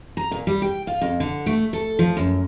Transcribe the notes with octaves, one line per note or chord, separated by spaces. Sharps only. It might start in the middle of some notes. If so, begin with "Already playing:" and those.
A#5
A#2
G3
G5
F4
F2
D3
A3
A4
F3
F#2